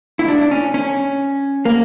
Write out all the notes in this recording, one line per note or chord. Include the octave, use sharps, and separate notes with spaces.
E4
D4
C#4
C#4
A#3